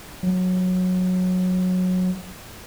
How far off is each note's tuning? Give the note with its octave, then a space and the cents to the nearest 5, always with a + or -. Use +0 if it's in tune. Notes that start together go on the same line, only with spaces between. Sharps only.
F#3 -15